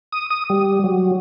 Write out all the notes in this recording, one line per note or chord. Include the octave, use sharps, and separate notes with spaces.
D#6
D#6
G3
F#3